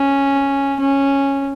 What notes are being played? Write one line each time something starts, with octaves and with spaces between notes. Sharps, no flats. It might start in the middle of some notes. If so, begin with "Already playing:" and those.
Already playing: C#4
C#4